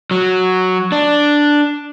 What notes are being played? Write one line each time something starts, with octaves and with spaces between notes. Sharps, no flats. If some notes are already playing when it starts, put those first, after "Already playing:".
F#3
D4